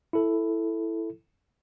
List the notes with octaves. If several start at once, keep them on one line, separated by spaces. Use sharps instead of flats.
E4 A4